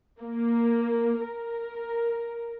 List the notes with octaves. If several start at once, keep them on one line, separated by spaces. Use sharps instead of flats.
A#3
A#4